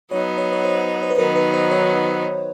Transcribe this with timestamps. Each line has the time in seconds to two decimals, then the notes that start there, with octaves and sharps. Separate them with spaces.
0.11 F#3 B3 D#4 C#5
0.38 C#5
0.52 C#5
0.65 C5
1.03 C5
1.10 B4
1.17 D#3 F#3 B3 D#4 A#4
1.36 B4
1.54 C5
1.71 C#5